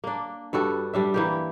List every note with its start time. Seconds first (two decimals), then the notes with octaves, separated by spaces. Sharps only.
0.04 A#3 D4
0.53 G2 G3 F#4 A4
0.93 G3 D4 E5
1.14 E3 A#3 G4